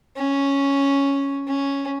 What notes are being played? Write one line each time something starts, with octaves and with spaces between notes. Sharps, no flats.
C#4
C#4